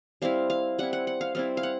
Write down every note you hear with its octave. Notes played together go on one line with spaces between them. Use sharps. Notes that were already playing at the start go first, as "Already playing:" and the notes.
G3 C4 E4 F5
F5
G3 C4 E4 F#5
F#5
F#5
F5
G3 C4 E4 F5
F5
F#5